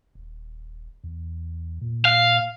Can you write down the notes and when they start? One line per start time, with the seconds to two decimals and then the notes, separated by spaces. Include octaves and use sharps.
0.15 D#1
1.04 E2
1.81 A#2
2.05 F5